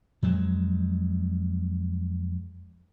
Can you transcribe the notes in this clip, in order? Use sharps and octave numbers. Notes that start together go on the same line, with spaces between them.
F2 F#3 G#3